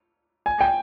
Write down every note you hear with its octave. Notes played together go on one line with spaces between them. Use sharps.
G#5
G5